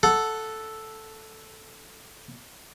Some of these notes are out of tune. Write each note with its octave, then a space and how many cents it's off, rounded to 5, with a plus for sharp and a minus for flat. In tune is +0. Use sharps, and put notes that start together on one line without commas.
A4 +0 F#5 +0